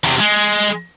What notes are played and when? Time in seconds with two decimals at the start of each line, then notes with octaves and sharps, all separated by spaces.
0.04 E2 C3
0.20 G#3